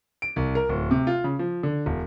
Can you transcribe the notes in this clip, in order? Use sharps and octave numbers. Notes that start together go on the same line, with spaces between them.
D7
C2
A#4
D1
C3
F4
C#3
F3
D3
E1